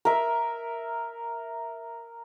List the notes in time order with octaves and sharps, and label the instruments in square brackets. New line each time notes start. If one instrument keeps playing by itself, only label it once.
[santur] A#4 E5